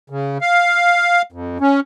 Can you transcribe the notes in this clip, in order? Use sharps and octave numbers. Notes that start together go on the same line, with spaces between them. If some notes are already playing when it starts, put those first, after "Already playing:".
C#3
F5
F2
C#4